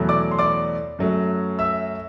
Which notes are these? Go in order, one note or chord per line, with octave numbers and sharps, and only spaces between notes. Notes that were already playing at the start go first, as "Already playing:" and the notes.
Already playing: E2 B2 F#3 A3
D5 D6
C6
D5 D6
F#2 F#3 A3
E5 E6